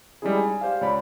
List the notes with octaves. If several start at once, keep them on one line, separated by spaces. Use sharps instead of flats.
G3 G#3 C#4 D#4 E4 G#4
G#5
G4 C5 D5 F5
C#2 C#5 D5 B5